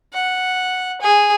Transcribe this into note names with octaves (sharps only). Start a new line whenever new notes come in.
F#5
G#4